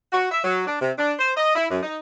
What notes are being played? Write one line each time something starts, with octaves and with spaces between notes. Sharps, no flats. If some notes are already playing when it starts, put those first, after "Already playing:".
F#4
E5
F#3
D4
C3
D4
C5
D#5
E4
F#2
D#4